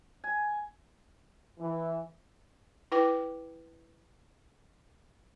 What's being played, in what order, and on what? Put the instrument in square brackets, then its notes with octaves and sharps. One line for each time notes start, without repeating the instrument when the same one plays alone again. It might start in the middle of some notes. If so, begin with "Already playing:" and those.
[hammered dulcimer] G#5
[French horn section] E3
[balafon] E4 B4 G5 D6